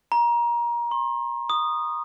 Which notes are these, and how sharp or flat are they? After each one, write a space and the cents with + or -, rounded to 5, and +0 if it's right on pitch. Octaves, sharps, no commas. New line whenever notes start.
A#5 +25
C6 +40
D#6 -15